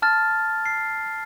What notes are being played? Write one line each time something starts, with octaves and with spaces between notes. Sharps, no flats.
A5 F6 A6
C7